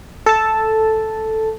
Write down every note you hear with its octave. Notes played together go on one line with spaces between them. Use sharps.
A4 A5